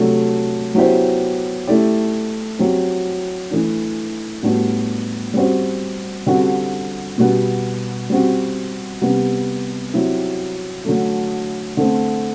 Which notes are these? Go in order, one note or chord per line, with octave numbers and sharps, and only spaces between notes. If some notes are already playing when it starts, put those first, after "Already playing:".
Already playing: C3 F#3 A3 D4 A4
F#3 B3 E4 G4 C5
A3 E4 G4 D5
F#3 C4 G4
E3 A3 D4
A2 G3 B3 D4 F#4
G3 C4 F#4 C5
D3 G3 C4 F#4
B2 G3 B3
G3 C4 F#4
C3 G3 B3
F#3 C4 E4 G4
D3 F#3 A3
D3 A3 C4